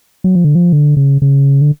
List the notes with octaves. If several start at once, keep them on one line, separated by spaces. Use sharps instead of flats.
F#3
F3
D3
F3
D3
C#3
C#3
D3